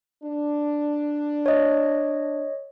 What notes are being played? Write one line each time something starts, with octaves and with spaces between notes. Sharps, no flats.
D4
C#5 D#5